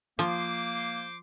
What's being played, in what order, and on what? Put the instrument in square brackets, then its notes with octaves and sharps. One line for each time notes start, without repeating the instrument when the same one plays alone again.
[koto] F3 [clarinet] A#3 [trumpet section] C5 C6 D6